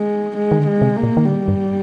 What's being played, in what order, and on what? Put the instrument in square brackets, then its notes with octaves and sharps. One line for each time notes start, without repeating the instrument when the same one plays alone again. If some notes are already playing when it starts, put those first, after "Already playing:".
Already playing: [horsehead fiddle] G#3
G#3
[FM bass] D#3
D3
[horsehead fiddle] G#3
[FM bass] C3
[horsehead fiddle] A#3
[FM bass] A#2
D#3
[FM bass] D3 [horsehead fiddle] G3
[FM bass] G2